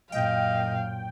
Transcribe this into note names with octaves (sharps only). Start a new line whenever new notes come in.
F#2 A#2 D#5 F5 G5